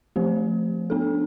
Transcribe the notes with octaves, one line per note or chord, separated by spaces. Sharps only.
F3 A3 C4 G4 C5
B3 D4 A4